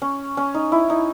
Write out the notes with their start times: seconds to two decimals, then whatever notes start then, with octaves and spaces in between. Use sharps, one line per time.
0.02 C#4
0.37 C#4
0.55 D#4
0.72 E4
0.90 D#4